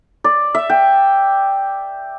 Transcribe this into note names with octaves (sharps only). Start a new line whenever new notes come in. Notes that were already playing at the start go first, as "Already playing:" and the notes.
D5
E5
G5